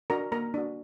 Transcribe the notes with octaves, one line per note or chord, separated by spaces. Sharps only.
D4 F#4 A#4 A#5
A#3 A#4 A#5
D4 F#4